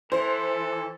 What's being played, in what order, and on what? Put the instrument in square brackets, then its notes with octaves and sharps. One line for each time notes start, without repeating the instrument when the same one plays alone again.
[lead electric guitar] E3 [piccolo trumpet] A4 [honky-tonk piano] C5